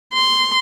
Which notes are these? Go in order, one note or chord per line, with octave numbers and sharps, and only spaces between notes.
C6